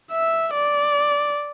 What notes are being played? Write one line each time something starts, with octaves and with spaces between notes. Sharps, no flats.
E5
D5